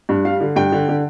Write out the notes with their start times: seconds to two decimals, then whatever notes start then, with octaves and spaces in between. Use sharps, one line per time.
0.09 G2
0.25 G3 F5
0.40 D3
0.56 G2 G5
0.72 D3
0.88 D3